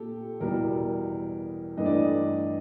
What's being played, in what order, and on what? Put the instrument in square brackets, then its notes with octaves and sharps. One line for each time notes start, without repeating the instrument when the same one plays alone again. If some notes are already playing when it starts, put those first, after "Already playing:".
Already playing: [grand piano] A#2 G4 A4
E2 B2 G3 A#4
G2 E3 A3 D#5
D5
D#5